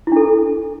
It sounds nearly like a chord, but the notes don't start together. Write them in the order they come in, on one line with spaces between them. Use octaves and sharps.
E4 D4 A4